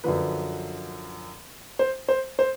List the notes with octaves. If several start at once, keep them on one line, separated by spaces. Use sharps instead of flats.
F#2 D3 F3 B4
C5
C5
C5